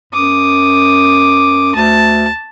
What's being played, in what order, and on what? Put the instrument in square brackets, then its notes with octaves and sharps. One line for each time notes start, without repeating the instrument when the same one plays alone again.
[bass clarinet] F#2 [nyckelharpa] D6 D#6
[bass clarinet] D2 [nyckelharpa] A5